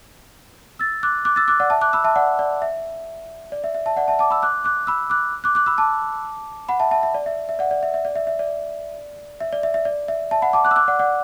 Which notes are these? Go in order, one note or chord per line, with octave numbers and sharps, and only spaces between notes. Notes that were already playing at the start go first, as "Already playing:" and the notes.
E6 A6
D6 F#6
D6 F#6
E6 A6
D6 F#6
D5 F#5
E5 A5
D6 F#6
B5 E6
E5 A5
D5 F#5
D5
E5
D5
E5
E5
E5 A5
D5 F#5
E5 A5
A5 D6
B5 E6
D6 F#6
D6 F#6
B5 E6
D6 F#6
D6 F#6
D6 F#6
B5 E6
A5 D6
F#5 B5
E5 A5
E5 A5
E5
D5
E5
E5
D5 F#5
D5
E5
E5
D5
E5
E5
D5
E5
D5
E5
E5
D5
E5
E5 A5
F#5 B5
A5 D6
D6 F#6
E6
D6 F#6
D5 F#5
D5 F#5